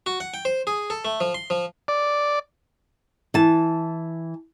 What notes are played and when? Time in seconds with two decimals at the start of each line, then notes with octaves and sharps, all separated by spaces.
0.06 F#4
0.20 F#5
0.34 G5
0.45 C5
0.67 G#4
0.90 A4
1.05 A3
1.21 F3
1.34 C6
1.50 F3
1.88 D5
3.34 E3 A5